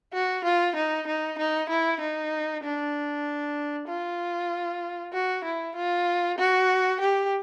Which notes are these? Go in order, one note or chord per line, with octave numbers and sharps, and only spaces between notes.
F#4
F4
D#4
D#4
D#4
E4
D#4
D4
F4
F#4
E4
F4
F#4
G4